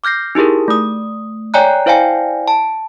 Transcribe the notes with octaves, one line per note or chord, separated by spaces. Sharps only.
D6 F6 G6 A#6 C7
D#4 E4 G4 G#4 A#4
A3 D#6
C#5 D5 G5 G#5 A#5 F#6
E4 C5 D5 F5 G5 G#5
A5